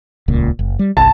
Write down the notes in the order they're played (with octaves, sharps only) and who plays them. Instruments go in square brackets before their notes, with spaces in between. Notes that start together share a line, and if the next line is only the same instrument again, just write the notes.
[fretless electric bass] D#1 C#2 A#2
F#1
G3
[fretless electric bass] G1 C2 [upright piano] A5